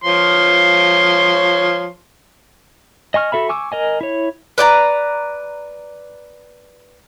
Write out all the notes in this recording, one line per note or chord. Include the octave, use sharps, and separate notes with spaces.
F3 C#5 C6
D#5 G#5 C#6 F6
F#4 A4 E5 B5
G#5 C#6 D6 E6
A#4 D#5 G#5
E4 C#5
B4 D5 G5 A#5